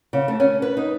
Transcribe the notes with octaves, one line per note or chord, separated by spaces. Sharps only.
C#3
A3
C#4
B4
D#4